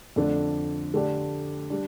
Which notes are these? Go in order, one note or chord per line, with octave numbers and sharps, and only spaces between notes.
F2 D3 A3 D4
D3 A3 D4 G4 D5
G3 D4